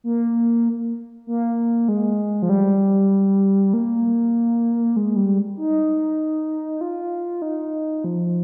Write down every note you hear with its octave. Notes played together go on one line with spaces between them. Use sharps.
A#3
A#3
G#3
F3
G3
A#3
G#3
G3
D#4
F4
D#4
F3